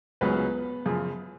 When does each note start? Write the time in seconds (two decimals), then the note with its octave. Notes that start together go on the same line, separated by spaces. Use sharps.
0.21 C#2 C#3 F#3 B3 B4
0.86 F#2 C#3 F3